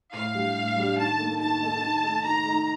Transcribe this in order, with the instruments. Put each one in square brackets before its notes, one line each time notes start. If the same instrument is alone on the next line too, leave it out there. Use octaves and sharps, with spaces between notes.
[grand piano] A2 [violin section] F5
[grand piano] G3 D4 G4
A2
G3 D4 G4
[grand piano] D#3 [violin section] A5
[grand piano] A#3 D#4 A4
[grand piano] D#3 [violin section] A5
[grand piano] A#3 D#4 A4
D#3
A3 D#4
[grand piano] D#3 [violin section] A#5
[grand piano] A3 D#4